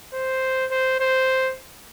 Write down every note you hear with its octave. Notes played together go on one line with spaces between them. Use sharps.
C5
C5
C5